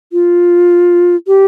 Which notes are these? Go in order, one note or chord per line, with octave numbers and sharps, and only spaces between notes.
F4
G4